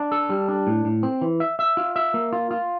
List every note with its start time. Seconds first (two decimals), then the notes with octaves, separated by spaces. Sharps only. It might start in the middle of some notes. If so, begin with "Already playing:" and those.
Already playing: D4
0.12 A4
0.30 G3
0.48 D4
0.67 A2
0.85 A2
1.03 C4
1.21 E3
1.40 E5
1.59 E5
1.77 F4
1.96 E5
2.14 A#3
2.33 F4
2.51 F4